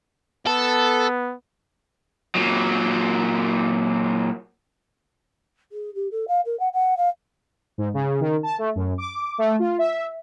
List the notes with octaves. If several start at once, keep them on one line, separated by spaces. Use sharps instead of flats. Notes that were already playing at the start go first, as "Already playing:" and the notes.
B3 A4
A#2 F#3
G#4
G4
A4
F5
A#4
F#5
F#5
F5
G#2
C#3
D#3
A5
A3
F#2
D6
A3
F4
E5